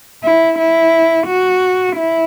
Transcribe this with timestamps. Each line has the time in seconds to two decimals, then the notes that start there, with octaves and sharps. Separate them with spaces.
0.24 E4
0.58 E4
1.27 F#4
1.96 E4